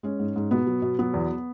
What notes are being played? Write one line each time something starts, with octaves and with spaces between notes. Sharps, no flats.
G#3 C#4
G#2
G#2
B2 B3
F#3
B2
F#3 B3
E2